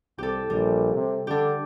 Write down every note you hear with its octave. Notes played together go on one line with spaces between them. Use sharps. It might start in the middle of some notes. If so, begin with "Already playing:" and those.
C2 G4 A4
A#1 G3
C3
D3 D4 G4